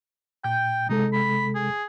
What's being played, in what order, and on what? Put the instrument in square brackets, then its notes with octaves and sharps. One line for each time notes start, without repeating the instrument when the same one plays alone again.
[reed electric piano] A#2 G6 [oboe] G5
[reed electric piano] C3 G#3 A4 [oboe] D#4
[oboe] B5
G#4